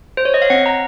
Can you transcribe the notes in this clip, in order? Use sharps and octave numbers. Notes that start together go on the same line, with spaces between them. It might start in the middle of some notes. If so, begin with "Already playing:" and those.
C5
C#5
D#5
F5
C4 F#5
A#5